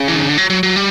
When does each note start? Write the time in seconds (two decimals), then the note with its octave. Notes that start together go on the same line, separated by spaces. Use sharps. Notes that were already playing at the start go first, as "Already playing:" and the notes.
Already playing: C#3
0.08 E3
0.16 D#3
0.24 D3
0.37 F#3
0.50 F#3
0.63 F#3
0.76 G3